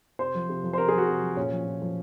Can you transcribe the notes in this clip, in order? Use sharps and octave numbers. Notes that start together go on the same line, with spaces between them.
C3 C5
F3
C3
F3
C5
C3 A#4
G#4
F3 F#4
C3
F3
A#2 C#4
F3
A#2
F3